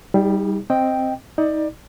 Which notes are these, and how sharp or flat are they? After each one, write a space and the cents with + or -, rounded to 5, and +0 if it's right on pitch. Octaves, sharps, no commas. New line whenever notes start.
G3 -5 D#4 +35 G#4 -45
C4 +5 D#5 +0 G5 +0
D#4 +30 D5 +25